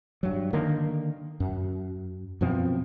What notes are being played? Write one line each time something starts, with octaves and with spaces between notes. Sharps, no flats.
G2 F#3
D3 D#3 A#3
F#2
F#2 B2 F3 C4